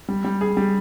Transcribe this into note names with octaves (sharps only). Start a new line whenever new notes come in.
G3
G3
G#4
G3